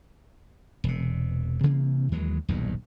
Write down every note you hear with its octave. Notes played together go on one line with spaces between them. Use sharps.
E1 C3
C3 E3 A#3 C4
D#2 E3 F#3 G#3
D#1 B1 E2 G2